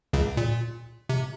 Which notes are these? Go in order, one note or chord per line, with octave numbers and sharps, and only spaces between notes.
C#2 C#3
A#2
C3